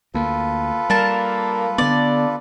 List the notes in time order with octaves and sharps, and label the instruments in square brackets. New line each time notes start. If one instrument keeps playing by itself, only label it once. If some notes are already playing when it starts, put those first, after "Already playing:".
[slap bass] D2 A#3 [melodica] F4 A4 B4
[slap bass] G3 [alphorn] A#3 [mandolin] D4 A#4 A5
[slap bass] D3 B3 [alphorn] D4 [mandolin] D5